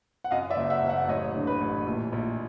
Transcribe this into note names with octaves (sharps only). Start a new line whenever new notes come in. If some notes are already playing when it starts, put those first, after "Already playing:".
F#5
F#2 D#5 F5
D5 E5
F#1
E5 F#5
F#1
E5 F#5
A1 C#5 D#5
D3
B4
A1
A#1
A#1